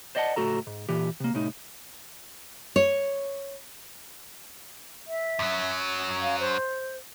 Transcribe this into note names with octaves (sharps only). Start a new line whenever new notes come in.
C5 D5 D#5 F5 F#5 A5
C#2 A2 F#4 A4 A#5
G#2
A#2 E3 G4
C3 A#3
C2 A2 D#4
C#5
E5
F#2 F#3
F5
C5